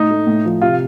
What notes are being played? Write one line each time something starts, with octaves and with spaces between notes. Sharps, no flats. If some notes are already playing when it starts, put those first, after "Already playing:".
Already playing: A2 D#4
A3
A2
F3
C3 F4